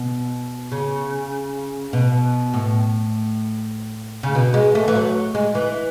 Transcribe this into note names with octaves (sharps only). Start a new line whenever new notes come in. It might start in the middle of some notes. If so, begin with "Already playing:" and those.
Already playing: B2
C#3
B2
A2
C#3
B2
G#3
A3
E3
F#3
G#3
E3